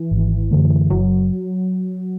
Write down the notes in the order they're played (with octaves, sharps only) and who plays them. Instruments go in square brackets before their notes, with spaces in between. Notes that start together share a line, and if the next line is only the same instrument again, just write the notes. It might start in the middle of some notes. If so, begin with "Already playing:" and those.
Already playing: [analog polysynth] E3
[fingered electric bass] G#1
F#2 D3 A3
[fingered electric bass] F#1 [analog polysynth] F#3